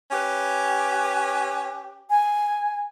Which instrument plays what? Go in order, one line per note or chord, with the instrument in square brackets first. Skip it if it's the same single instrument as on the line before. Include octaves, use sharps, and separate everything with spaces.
[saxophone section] C#4 G4 B4
[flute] G#5